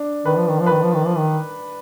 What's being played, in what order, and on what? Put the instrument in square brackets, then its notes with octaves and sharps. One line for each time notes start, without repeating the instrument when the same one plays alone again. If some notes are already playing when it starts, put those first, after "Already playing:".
Already playing: [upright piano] D4
[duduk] D#3 [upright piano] B4
[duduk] F3
D#3
F3
[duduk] D#3 [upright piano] B4
[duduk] F3
D#3
F3
D#3